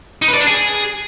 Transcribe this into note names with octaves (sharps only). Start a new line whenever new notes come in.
D#4
B4
D5
D4
G#4